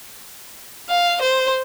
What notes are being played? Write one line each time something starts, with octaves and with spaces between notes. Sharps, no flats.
F5
C5